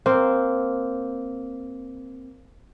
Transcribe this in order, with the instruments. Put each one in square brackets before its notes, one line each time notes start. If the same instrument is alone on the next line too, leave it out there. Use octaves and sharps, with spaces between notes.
[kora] A#3 C4